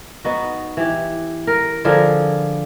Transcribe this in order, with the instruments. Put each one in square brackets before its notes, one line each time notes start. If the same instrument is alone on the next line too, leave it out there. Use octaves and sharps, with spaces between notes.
[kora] B3 D#4 F#4
E3 G4
A#4
D3 F3 G#4 A#4